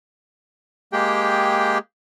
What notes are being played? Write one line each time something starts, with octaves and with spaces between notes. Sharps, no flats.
G#3 A#3 G4 G#4 G5